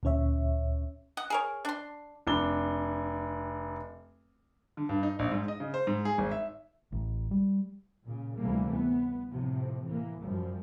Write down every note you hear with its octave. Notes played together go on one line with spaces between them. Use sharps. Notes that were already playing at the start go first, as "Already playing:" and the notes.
D2 A#2 C#4 C#5 E5
D#5 F#5
G#4 A#4 C#5
D4 C6
F1 D4 G7
D3
G2
D#4
A#1
G#2
D#5
C#3
C5
G#2
G#4
G#1
E5
A1
G3
A#2 C#3
D2 C3 E3 G3 A3 A#3
B3
A2 C3 F3
E3 A#3
F#2 F3 G3